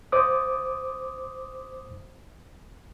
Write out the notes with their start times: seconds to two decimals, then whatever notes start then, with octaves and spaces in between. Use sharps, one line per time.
0.12 C5 D6 D#6